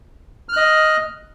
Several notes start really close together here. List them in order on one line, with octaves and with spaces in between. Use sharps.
F6 F#6 D#5